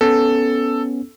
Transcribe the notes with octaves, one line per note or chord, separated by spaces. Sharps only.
B3 C#4 A4